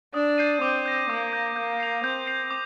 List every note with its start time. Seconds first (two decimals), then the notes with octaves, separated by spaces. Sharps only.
0.14 D4 D#6
0.38 G6 C7 D#7
0.61 C4 D6
0.86 G6 A#6
1.10 A#3 D6
1.33 G6 A#6
1.56 A#3 G6
1.80 C7 F7
2.04 C4 G6
2.27 C7 F7
2.51 D6